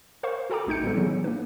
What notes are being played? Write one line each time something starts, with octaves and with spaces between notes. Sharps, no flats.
A#4 C5 F5 C#6
F#4 A4 G5 A#5 D6
A#1 A3 D#4 G6 C#7
A#2 G3 G#3 B3 A4
E3 F#3 B3 D#4 G#4
A#3 D4 B4